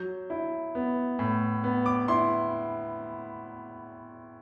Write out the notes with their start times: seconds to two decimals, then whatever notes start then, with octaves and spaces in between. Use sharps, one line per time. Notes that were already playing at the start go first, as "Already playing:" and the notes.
Already playing: F#3 G6
0.30 E4
0.75 B3
1.19 A2
1.64 B3
1.86 D6
2.08 E4 C6